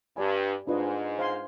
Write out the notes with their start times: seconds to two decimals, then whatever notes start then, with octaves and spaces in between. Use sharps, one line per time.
0.17 G2 G4 D5 G#5 B5
0.67 G#2 D4 F4 B4 D#5
1.19 C5 F5 G#5 C6